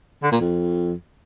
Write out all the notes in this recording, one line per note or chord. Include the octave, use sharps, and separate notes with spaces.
D3
A#2
F2